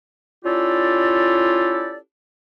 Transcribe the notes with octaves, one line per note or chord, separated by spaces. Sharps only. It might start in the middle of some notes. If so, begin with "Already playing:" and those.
C#4 E4 F4 G4 A4 D5